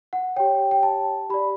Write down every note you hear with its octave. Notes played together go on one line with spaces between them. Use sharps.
F#5
G4 C#5 G5
G5
A5
G4 D5 B5